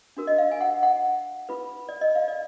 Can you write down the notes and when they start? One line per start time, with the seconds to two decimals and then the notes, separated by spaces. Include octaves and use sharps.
0.17 D4 F#4 A#4
0.27 D#5
0.38 F5
0.51 G#5
0.61 F#5
0.83 F#5
1.49 F4 B4
1.89 D5
2.01 D#5
2.15 F5
2.28 D5